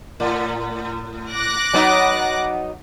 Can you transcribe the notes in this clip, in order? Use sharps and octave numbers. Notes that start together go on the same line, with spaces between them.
A2
D6 F#6 A#6
F#3 B3 D#4